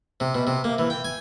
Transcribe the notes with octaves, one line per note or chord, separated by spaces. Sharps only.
C3
B2
C3
A#3
E3
G5
G#5